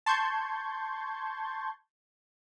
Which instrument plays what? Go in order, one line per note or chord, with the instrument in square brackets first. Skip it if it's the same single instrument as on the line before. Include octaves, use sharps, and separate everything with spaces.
[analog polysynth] A5 C6 C#6 G6 G#6